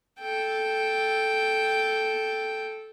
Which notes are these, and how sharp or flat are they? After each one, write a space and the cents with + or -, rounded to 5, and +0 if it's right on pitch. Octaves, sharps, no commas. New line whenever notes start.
A4 -10 G5 +0